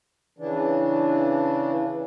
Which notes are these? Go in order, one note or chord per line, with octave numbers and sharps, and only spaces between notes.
C#3 E3 D4